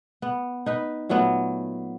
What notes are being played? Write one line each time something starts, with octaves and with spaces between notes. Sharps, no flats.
B3
D#4 B4
A#2 F#3 A3 B3